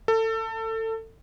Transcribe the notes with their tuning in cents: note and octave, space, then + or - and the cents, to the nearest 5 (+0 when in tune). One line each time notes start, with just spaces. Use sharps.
A4 +25